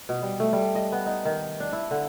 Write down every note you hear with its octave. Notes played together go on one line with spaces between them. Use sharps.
B2
G3
A3
G3
D#5
B3
D#4
D#3
D4
E4
D3